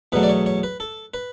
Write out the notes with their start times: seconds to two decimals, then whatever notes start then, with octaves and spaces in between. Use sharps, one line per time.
0.12 E2 B2 F#3 A3 B4
0.23 D5
0.29 C#5
0.46 C#5
0.63 B4
0.80 A4
1.14 B4